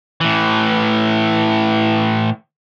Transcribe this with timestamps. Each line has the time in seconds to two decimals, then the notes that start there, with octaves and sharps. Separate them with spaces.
0.21 A2 E3